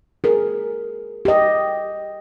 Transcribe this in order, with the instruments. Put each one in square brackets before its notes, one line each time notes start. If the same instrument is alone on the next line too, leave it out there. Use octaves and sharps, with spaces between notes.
[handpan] G#4 A#4
G4 D#5